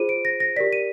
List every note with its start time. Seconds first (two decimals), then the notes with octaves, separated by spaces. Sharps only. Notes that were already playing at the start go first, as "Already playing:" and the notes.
Already playing: F4 G#4 C5 D#7
0.09 D7
0.25 A#6
0.40 A#6
0.56 G4 A#4 D5 B6
0.73 D#7